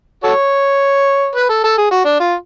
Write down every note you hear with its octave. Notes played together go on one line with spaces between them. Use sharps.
F#4 A4 C#5
B4
A4
A4
G#4
F#4
D4
F4